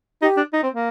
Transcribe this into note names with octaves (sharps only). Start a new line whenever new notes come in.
D#4 G4
D4
D#4
C4
A#3